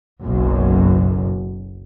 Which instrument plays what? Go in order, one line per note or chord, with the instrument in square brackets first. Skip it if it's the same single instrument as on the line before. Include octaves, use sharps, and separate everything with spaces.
[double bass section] F#1 B1 F#2